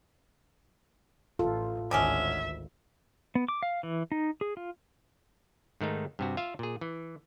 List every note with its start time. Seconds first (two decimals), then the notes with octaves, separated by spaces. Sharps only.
1.39 A1 F4 A4
1.91 G#1 D2 D3 G#3 C#4 E5
3.35 B3
3.48 D6
3.63 F5
3.83 E3
4.12 D#4
4.41 G#4
4.57 F4
5.81 G#2 D#3 A3 D#4
6.19 G2 C3 F#4
6.37 F4 E5 F5
6.59 A#2 G#4
6.81 E3